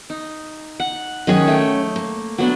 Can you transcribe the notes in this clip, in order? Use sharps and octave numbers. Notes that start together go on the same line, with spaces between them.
D#4
F#5
D#3 F#3 C#4 G#4 C#5
A3 G5
A#3
F#3 B3 D4